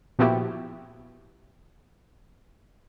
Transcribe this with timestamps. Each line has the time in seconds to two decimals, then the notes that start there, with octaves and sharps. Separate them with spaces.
0.19 A#2 F3 B3 E4 F#4 G4